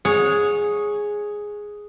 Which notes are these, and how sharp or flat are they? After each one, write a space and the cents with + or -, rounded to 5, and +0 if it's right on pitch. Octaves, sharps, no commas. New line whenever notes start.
G#4 +0 C#5 +0 F#5 -30